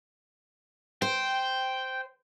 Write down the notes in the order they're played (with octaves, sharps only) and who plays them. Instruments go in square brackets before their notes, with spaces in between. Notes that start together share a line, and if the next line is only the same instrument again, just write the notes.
[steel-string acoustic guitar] C5 [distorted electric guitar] G5